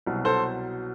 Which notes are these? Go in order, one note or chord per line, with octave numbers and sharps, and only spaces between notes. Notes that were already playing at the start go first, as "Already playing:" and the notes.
C2 B2 F#3
A4 C5